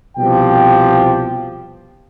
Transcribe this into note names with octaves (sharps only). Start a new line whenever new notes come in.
C2 B2 F3 G4 G5